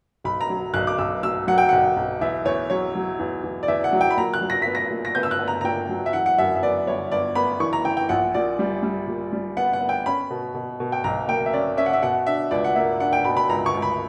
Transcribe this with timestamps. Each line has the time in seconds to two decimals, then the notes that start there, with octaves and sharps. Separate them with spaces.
0.24 B1 B5
0.41 A#5
0.50 F#3
0.74 B1 F#6
0.87 D6
0.98 B1 E6
1.23 F#3 E6
1.48 F#3 F#5
1.58 G5
1.69 B1 F#5
1.97 B1
2.21 E2 E5
2.45 E2 C#5
2.70 F#3 C#5
2.95 F#3
3.19 E2
3.43 E2
3.63 D5
3.68 E2 E5
3.84 F#5
3.93 F#3
4.01 G5
4.10 B5
4.17 A#2 A#5
4.34 F#6
4.41 F#3
4.50 A#6
4.62 B3 B6
4.75 A#6
4.91 A#2
5.05 A#6
5.15 B3 G6
5.23 E6
5.31 F#6
5.39 B3
5.48 A#5
5.61 A#5
5.64 A#2 G5
5.89 F#3
6.06 E5
6.13 E3 F#5
6.26 F#5
6.38 F#2 E5
6.55 E5
6.62 B3 D5
6.87 G1 C#5
7.12 G1 D5
7.35 B3 B5
7.60 E3 C#6
7.73 A#5
7.85 E3 G5
7.97 G5
8.09 A#1 F#5
8.34 A#2 D5
8.59 G3
8.83 G3
9.07 A#2
9.33 G3
9.57 B3 F#5
9.73 F#5
9.81 B3
9.89 G5
10.06 C#4 B5
10.30 B2
10.54 B2
10.80 B2
10.92 G5
11.04 B1 A#5
11.28 A#3 G5
11.46 E5
11.53 C#4 D5
11.77 C#4 E5
11.86 F#5
11.93 E5
12.02 B2 F#5
12.27 D4 E5
12.51 C#2 D5
12.64 F#5
12.76 A#3 E5
13.00 D4 F#5
13.13 G5
13.25 B2 B5
13.37 B5
13.49 C#2 A#5
13.66 C#6
13.74 C#2
13.82 B5